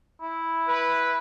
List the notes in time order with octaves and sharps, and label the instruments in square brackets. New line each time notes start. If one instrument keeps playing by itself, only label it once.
[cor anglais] E4
[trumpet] B4